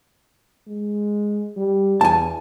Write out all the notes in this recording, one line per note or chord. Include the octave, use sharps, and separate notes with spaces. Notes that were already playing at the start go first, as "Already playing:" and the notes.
G#3
G3
E2 G#5 A5